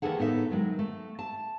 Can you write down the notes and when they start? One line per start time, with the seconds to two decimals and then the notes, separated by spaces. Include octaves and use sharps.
0.02 D#2 D#3 E3 G#4 A4 F#5
0.18 A2 B3 D#4 E4 A4 E5
0.51 D#3 F#3 G#3
0.79 A3
1.19 A5